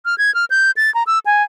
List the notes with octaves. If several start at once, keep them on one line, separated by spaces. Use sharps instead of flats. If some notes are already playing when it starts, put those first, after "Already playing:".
F6
G#6
F6
G6
A6
A#5
E6
G#5